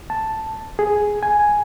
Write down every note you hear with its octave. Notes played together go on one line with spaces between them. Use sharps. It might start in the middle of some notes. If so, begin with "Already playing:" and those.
A5
G#4
G#5